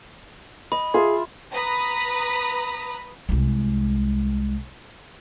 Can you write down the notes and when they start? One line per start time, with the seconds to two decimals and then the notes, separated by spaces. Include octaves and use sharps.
0.72 D#5 B5
0.94 F4 G#4 E5
1.53 B4 A#5 B5 D#6
3.29 C2 G#3